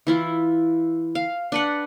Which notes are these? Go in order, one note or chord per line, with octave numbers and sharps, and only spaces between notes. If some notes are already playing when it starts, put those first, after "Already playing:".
E3 E4 F4
F5
D4 B4 F#5